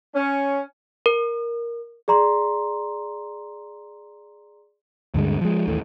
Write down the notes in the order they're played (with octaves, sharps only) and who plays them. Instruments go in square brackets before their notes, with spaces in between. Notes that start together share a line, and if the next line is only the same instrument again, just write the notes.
[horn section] C#4
[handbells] A#4
[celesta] G#4 D5 A#5 C6
[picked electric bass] D2 G2 D3 G#3
F3 G#3
A1 D#2 A2 A3